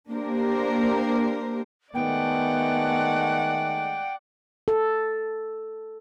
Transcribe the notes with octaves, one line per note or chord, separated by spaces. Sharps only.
A#3 D4 G4 A#4 C5
D#3 G#3 A3 B3 D5 F#5 G5
A4